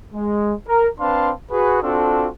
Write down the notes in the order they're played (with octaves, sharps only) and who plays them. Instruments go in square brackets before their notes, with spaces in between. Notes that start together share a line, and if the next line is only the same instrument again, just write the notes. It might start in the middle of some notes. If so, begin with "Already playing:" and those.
[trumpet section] G#3
A#4
C4 D4 B4 F5 A5 C6
F#4 G#4 B4
C4 D4 F4 F#4 A4